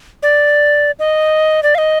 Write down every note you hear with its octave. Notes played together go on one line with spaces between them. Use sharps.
D5
D#5
D5
F5
D#5